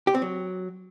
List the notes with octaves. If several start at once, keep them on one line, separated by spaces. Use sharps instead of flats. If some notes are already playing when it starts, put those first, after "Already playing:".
G4
C4
F#3